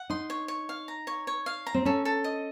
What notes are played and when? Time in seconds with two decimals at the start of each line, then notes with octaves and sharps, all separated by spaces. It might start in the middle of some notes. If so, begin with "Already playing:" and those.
Already playing: F#5
0.10 D#4 C6
0.30 C#5
0.48 C#5
0.69 F5
0.88 A#5
1.07 C#5
1.27 C#5
1.46 F5
1.67 A#5
1.74 C4
1.85 C#4 A4
2.05 A4
2.24 D#5